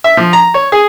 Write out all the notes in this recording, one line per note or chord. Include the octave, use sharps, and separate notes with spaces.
E5
F3
A#5
C#5
G#4